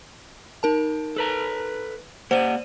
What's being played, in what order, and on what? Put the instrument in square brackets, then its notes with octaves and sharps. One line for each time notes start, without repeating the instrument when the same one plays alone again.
[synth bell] D#4 A#4 A5
[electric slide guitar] A4 B4 A#5
[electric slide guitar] A#3 G4 F#5 [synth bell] C5 D5 D#7